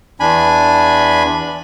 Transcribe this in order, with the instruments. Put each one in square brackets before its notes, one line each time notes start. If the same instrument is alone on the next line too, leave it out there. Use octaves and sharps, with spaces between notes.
[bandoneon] E2 D4 G#5 B5